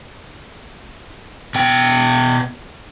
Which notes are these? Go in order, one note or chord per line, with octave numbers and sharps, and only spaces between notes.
B2 G5